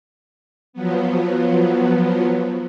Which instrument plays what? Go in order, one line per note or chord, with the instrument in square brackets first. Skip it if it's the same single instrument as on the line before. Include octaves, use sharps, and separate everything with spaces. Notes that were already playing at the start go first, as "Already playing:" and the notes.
[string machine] F3 F#3 B3